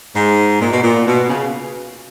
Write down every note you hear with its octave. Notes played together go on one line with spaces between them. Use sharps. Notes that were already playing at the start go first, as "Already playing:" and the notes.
G#2
A#2
B2
A#2
B2
C#3